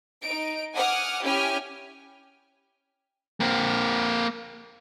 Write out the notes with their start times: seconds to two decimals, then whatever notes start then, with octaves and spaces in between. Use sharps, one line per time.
0.22 D#4 D7
0.75 F#5 G#5 D6 D#6 F6
1.24 C#4 E4 G4 G5 G#5 F6
3.40 A#3 C4